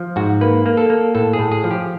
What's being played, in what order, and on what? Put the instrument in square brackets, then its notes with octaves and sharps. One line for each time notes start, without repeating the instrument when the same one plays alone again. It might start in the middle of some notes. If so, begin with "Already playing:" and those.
Already playing: [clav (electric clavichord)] F3
G#2 F#4
A#3 B4
A#3
A4
A#3
A2 A4
G#4
A2
G#4
F3
G4